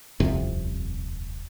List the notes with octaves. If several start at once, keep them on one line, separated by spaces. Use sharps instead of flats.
D#1 C2 F2 C3